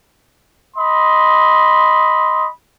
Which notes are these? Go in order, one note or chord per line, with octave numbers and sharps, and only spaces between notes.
D#5 B5 C6